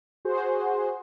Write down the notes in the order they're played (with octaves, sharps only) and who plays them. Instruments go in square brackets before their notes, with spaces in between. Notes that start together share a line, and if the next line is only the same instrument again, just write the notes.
[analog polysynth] F#4 G#4 C5